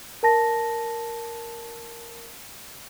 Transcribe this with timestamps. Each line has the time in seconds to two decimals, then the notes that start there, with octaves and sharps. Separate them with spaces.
0.23 A#4 A5 A#6